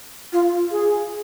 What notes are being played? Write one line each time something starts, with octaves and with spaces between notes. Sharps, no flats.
F4
G#4